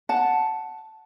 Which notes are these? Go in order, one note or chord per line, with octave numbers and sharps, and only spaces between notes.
F#5 A5